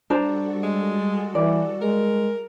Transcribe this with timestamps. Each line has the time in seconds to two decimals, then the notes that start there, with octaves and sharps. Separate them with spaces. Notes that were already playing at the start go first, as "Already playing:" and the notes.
0.10 G3 D4 F#4 A4 C5 A#5
0.63 G#3
1.35 E3 D5
1.81 G#3 A#4